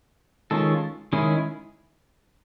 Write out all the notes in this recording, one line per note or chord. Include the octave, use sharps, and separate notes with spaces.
D#3 G#3 C#4 F4 A4
D#3 G#3 C#4 E4 G#4